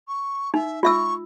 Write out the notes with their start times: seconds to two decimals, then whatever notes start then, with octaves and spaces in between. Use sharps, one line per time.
0.08 C#6
0.54 D#4 E5
0.83 F4 E5 C#6 E6